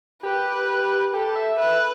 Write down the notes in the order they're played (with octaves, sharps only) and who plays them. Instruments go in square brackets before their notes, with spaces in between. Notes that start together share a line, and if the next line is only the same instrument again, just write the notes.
[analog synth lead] G4 [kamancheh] B4
[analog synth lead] G4 [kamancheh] A4
[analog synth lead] E5
[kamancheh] B4 [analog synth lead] E5